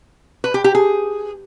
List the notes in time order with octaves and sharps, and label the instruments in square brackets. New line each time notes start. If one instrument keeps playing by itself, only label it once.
[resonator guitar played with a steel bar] B4
G4
G4
G#4